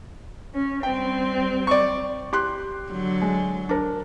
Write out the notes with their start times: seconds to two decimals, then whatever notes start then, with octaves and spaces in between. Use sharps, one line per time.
0.54 C#4
0.83 G3 C4 G5
1.67 D5 C#6
2.33 G4 C6 F#6
2.90 D3 F#3
3.21 G#3
3.69 D4 A#4